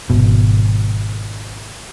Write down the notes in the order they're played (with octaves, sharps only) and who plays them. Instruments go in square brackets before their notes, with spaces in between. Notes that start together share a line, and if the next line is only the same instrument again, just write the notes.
[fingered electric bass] G#1 B2